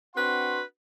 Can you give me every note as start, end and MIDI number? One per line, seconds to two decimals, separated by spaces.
0.15 0.61 60
0.15 0.61 62
0.15 0.61 66
0.15 0.61 71
0.15 0.61 78
0.15 0.61 84